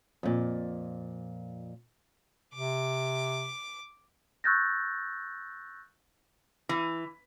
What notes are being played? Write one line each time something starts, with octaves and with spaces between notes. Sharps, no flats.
F2 A#2
C3 D6
C#6 E6 F#6 G6 A6 A#6
E3